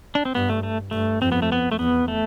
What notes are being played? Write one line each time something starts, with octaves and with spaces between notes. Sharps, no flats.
D4
C4
G2 B3
A3
A3
G2 A3
F2 C4
B3
A3
B3
A3
E2 B3
A3